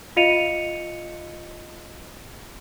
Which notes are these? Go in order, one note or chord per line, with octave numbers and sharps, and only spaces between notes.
F4 D#5 F5 C#7 D#7 F7